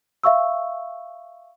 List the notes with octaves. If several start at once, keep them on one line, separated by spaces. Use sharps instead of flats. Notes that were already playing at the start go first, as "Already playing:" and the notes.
E5 F5 C#6 E6